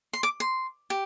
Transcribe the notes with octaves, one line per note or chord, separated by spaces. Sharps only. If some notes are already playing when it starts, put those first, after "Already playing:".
C6
D6
C6
G4